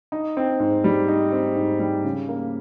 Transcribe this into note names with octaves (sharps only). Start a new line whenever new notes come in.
D#4
C4
G#2
G3
D#4
C4
G#2
G3
C#3
A#3